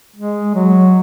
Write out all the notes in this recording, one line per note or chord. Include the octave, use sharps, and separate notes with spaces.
G#3
F#3